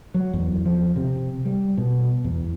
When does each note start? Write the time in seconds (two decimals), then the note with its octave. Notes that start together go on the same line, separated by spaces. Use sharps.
0.14 F#3
0.34 E2
0.65 F3
0.96 C3
1.45 G3
1.77 B2
2.25 E2